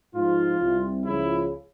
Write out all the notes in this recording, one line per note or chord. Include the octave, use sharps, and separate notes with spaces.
G#2 F3 F4
C2 C3 G3
C#2 C#3 F3 E4